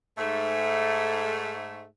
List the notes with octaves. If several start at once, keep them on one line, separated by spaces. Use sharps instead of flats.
G#2 A3